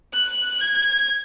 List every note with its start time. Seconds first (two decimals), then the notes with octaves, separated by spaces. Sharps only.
0.14 F#6
0.60 G#6